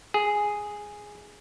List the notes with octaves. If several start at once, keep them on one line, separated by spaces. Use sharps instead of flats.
G#4